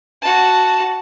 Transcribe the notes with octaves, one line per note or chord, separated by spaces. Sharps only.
F#4 A5